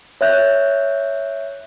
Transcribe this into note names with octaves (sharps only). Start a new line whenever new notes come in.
C#5 E5 F#6 G6